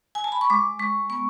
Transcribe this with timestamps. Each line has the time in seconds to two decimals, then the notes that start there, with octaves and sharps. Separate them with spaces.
0.15 G#5
0.24 A5
0.32 B5
0.41 C#6
0.50 G#3 D6
0.79 G#3 C#6
1.10 B3 C#6